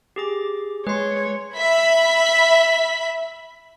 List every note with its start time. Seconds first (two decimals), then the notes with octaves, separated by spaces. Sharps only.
0.16 G4 G#4 D6
0.87 G#3 B4 C#5 C6
1.57 E5 B5 B6